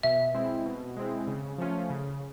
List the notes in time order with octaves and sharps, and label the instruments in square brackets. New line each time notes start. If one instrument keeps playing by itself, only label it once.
[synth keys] B2 [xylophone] E5
[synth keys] G#3 C4 E4
B2
G#3 C4 E4
C#3
F3 A3 C#4 F4
C#3